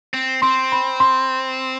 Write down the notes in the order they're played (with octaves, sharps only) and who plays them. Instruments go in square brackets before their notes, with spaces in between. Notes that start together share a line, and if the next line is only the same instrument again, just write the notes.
[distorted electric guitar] C4
[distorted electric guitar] C4 [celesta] C6
[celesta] B5
C6